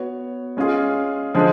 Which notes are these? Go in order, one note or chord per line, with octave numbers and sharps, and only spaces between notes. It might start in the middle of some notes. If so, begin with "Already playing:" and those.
Already playing: B3 F#4 C#5
G#3 C#4 F4 G#4
D3 F3 G#3 D4 G#4